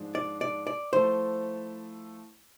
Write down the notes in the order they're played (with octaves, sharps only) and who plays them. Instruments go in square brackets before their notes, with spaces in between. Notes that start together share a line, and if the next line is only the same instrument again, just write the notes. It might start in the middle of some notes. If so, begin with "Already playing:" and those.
Already playing: [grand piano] G#2 F3 G#3 D4
[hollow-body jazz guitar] D5
D5
D5
[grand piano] F3 A3 E4 A4 [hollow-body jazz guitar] C5